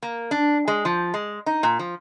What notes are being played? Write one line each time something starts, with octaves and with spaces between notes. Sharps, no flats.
A#3
D4
G#3
F3
G#3
D#4
A#2
F3